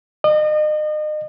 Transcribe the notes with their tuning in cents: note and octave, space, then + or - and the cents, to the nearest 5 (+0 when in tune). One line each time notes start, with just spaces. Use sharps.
D#5 -35